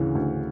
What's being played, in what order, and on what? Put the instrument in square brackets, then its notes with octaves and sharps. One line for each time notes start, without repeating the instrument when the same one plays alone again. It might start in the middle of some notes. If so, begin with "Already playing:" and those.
Already playing: [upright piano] D2 C#3 E3
D2